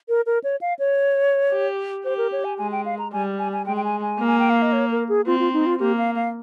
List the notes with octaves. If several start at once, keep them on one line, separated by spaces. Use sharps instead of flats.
A#4
A#4
C#5
F5
C#5
G4
G4 C5
A#4
C#5
G#5
G#3 G#5
G5
F5
A#5
G3 G#5
G#5
G#5
G#3 G5
G5
G#5
G#5
A#3
G#5
G5
F5
D#5
C#5
A#4
G#4
C4 F4
F4
D#4
F4
A#3 G4
F5
F5